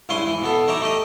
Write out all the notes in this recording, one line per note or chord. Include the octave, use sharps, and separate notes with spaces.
C#2 G2 E4 C#5 G#5 C6
E3
B2 B3 A4
D#4 C#5 E5 A#5 D6
A3 G4 D#5